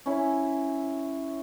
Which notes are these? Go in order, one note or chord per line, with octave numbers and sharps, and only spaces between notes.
C#4 E4